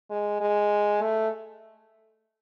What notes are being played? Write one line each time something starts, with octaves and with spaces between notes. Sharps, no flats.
G#3
G#3
A3